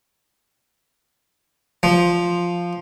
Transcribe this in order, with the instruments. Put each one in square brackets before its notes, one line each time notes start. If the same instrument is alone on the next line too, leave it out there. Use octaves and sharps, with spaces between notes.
[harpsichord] F3